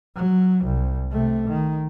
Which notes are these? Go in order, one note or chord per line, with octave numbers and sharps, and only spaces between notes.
F#3
C2
C3 A3
D#3